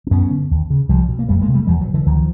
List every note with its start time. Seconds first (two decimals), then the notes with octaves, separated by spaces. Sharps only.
0.07 C4
0.11 F#2 B3 C#4
0.31 D3
0.51 D#2
0.70 C#3
0.89 C2 F3 G3
1.09 B2
1.19 A#3
1.29 F2 G3 A3
1.41 G#3 A#3
1.48 C3
1.54 G3 A3
1.67 E2 F3 G3
1.81 E3 F#3
1.87 B2
1.94 D3 E3
2.06 D2 D#3 F3